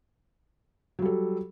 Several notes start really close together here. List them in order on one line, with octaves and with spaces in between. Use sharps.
F#3 G3 A4